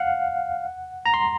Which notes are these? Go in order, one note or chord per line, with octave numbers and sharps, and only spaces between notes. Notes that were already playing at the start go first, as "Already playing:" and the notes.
Already playing: F5 F#5
A#5
C6